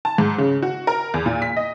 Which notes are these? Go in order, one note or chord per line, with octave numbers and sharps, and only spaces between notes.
A5
G#2
C#3
F#4
A#4
E2
A#2
B6
D#5